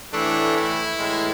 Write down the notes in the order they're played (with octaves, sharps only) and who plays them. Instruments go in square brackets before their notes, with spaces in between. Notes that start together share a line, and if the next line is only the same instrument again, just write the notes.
[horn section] A2 E3 A3 D4
E4
A2 E3 G#3